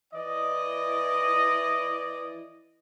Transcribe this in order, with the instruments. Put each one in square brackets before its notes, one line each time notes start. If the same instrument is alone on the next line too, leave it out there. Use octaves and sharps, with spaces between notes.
[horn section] E3 E4 D5 D#5